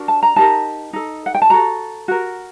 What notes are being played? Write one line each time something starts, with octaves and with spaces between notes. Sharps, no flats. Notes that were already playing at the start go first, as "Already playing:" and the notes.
Already playing: D4 F#4 A#4
A5
A#5
D#4 G4 A#4 A5
D#4 A4
F#5
G5
A5
F#4 A4 A#5
F#4 A#4